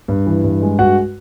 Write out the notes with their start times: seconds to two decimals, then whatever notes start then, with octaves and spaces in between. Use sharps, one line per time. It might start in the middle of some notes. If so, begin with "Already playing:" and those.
0.08 G2
0.27 E3
0.44 G2
0.62 G#3
0.79 G2 F#4 F#5